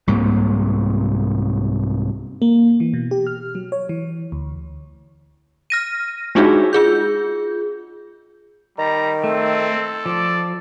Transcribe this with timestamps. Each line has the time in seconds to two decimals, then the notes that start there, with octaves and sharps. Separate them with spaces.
0.07 C2 G#2 C3 A#3
2.42 A#3
2.80 E3
2.93 B2
3.11 G4
3.27 F6
3.55 F#3
3.72 C#5
3.89 E3
4.32 D2
5.70 F6 A#6 D#7
6.35 G#3 D4 D#4 F4 F#4 G#4
6.73 F4 G#4 G6
8.79 D#3 G3 A#5
9.24 A3 C4 A4
10.06 F3 D5